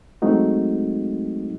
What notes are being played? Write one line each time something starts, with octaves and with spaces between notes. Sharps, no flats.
F#3 G#3 A3 C4 D#4 F#4